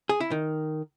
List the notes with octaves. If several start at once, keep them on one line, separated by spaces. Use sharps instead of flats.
G#4
E4
D#3